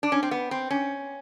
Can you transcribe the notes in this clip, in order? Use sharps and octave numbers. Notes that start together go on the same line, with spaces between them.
D4
C#4
C4
B3
C4
C#4